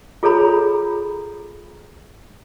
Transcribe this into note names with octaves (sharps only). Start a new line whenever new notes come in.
F4 G#4 A4 C#5 A#5 B5